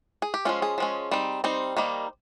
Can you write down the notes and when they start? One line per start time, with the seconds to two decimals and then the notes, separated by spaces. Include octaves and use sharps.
0.22 G#4
0.34 G4
0.45 F3 G#3 C#4 F4
0.62 G#4
0.78 F3 G#3 C#4
1.11 G3 C4 D#4
1.44 G3 C4 D#4 C5
1.77 D#3 G3 A#3 D#4